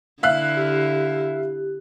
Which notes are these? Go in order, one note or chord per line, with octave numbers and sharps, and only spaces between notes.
D3 E4 E5 F5 F#6
G4